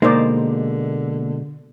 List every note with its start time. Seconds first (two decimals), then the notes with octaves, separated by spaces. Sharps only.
0.02 B2 D3 G#3 A#3 D#4 C5 D5